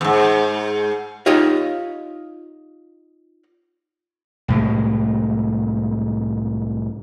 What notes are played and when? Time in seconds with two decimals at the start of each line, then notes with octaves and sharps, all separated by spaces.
0.01 E2 G#2
1.26 D#4 F4 G4 C#5 D#5 F5
4.48 C2 A2 G#3